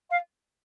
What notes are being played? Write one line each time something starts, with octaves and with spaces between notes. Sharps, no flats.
F5